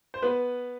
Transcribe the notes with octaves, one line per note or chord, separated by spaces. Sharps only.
C5
B3 B4